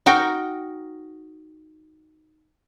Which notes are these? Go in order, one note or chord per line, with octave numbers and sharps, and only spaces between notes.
D#4 F#4 A#4 G5